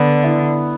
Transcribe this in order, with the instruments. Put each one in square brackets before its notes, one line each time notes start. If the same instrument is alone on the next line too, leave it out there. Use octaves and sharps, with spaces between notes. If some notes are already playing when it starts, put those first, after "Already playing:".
Already playing: [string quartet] D3 [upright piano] B3
[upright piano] E4